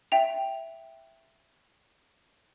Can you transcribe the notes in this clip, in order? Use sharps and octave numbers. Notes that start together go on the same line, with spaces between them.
E5 G5 F7